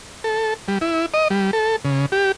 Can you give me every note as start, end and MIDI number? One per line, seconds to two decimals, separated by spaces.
0.24 0.54 69
0.68 0.78 55
0.81 1.06 64
1.14 1.28 75
1.30 1.51 55
1.53 1.76 69
1.85 2.06 49
2.12 2.32 67